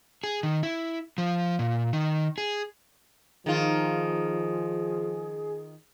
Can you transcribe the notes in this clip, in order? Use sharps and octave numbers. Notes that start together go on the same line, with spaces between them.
G#4
D#3
E4
F3
A#2
D#3
G#4
D#3 F3 F4 G#4